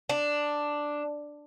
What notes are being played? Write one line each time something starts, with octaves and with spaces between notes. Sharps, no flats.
D4